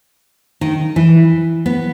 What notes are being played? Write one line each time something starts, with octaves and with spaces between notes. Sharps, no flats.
D#3
E3
B3